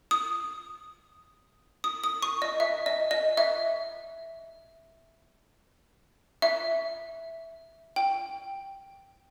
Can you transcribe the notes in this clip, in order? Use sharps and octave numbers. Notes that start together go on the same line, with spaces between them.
D#6
D#6
D#6
C#6
D#5
E5
D#5
D#5
E5
E5
G5